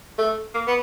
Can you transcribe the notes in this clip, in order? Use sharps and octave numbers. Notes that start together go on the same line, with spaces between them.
A3
A#3
B3